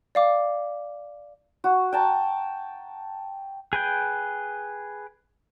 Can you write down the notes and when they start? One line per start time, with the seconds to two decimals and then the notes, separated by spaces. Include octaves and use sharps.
0.15 D5 F5 D6
1.64 F#4
1.92 G5 A5 A#5
3.73 G#4 B4 G5